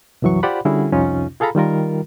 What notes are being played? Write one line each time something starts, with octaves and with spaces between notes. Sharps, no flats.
C2 F#2 E3 F#3 C#6
F4 G4 C5 D5 F#5 B5
D3 G3 C#4 E4 F#4 G#4
C2 F2 C3 C#4 D#4 F4
F4 G#4 A4 F5 A#5 B5
D#3 G3 F4 A#4